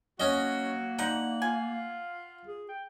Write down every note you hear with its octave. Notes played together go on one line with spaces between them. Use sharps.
F#3 A#3 C#4 F#4 D#5
D3 D#4 F#5
F4 G#5
G#4
G5